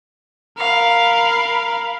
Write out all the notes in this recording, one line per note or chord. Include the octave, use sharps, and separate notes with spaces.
A#4 F5 B5